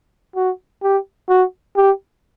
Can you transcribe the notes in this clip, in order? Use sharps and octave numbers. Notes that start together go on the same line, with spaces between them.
F#4
G4
F#4
G4